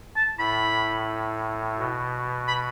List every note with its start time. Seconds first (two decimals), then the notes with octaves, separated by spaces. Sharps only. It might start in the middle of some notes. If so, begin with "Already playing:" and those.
0.16 A5
0.39 A2 B5
1.78 B2
2.48 B5